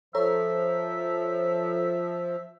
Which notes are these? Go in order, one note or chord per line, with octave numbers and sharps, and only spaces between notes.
F3 A4 C#5 E5 A#5